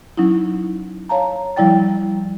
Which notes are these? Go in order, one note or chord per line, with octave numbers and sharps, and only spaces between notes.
F#3 C#4 D#4 E4
C#5 F5 A5 A#5
F3 G3 E4 D5 G5 A6